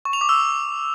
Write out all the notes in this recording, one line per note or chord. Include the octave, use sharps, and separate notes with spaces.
C#6
F7
D6
E6